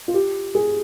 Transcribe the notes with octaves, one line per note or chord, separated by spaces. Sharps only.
F4
G4
G#4